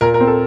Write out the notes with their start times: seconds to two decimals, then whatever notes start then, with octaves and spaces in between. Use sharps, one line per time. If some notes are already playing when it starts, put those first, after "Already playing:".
0.01 A#2 A#4
0.14 A#4
0.20 C4
0.27 A4